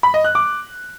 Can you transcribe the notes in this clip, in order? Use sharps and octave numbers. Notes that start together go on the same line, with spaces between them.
B5
D#5
F#6
D6